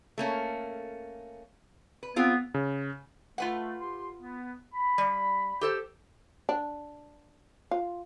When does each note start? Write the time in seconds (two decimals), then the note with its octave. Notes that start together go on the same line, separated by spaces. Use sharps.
0.18 A3 A#3 C#4
2.03 B4
2.16 B3 C4 F4 G#4
2.54 C#3
3.38 A3 F4 B4 F#5
3.80 G4 C6
4.20 B3
4.73 B5
4.98 G3
5.61 G4 A4 C5
6.49 D4
7.71 F4